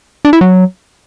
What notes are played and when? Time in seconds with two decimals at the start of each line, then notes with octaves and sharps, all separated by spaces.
0.25 D4
0.33 E4
0.41 F#3